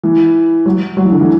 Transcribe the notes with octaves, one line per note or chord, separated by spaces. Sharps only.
E3
F#3
F#3
E3
D3
E3